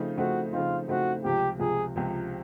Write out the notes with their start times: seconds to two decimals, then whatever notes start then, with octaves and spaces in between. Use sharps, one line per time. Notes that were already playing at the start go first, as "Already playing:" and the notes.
Already playing: C#3 F3 A3 C4 D#4
0.17 C#3 F3 A3 C4 D#4 F#4
0.53 C#3 F3 A3 C4 D#4 F4
0.88 C#3 F3 A3 C4 D#4 F#4
1.24 C#2 C3 F3 G4
1.59 C#2 C3 F3 G#4
1.96 C#2 C3 F3